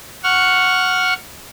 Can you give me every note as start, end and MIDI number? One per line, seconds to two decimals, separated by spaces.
0.24 1.14 78
0.24 1.14 85
0.24 1.14 89